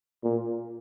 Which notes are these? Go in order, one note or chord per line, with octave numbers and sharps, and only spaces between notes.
A#2